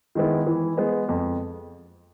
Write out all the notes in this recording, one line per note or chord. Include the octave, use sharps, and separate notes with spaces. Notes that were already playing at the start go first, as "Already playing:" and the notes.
D#3 G#3 B3 E4
E3
G#3 B3
F2